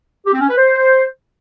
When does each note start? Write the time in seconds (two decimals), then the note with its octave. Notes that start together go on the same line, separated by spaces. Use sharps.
0.25 G4
0.33 C4
0.41 C#4
0.49 B4
0.56 C5